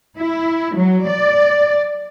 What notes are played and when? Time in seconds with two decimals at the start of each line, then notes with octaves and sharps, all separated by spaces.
0.18 E4
0.77 F#3
1.08 D5